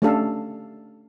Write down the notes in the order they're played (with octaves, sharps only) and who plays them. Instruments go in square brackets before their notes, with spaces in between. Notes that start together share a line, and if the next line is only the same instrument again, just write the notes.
[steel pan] A3 C#4 D4 G4 A4 F5